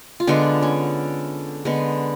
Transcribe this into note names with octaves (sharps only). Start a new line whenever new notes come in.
F4
D3 G#3 B3 D4
C#4
D3 G#3 B3